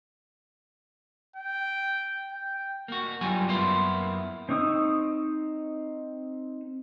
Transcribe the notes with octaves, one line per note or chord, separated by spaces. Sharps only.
G5
G5
A#3 F#4
G2 F#3 G3 F4 G5 G#5
F#2 A#3 B3 E4 F5 C6
C4 D#4 C#6 D#6 E6